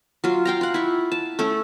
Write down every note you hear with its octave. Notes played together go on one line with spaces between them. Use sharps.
F#3 F4
F5 G5 A#5
F4 F#5
E4 C#6
A5
A3 C#4 A4